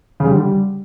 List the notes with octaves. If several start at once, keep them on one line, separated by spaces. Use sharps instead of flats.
C#3
G3
D3
G3